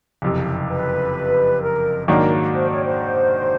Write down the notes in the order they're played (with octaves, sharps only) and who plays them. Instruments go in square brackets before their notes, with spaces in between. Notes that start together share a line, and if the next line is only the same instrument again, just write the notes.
[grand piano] F#1 F2 C3
[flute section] B4
A#4
[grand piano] G#2 D#3 F#3 A#3 D4 [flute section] A#4
[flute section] C5
C#5
C5